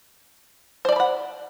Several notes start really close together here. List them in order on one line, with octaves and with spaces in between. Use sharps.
C5 D5 A5 B5 F#5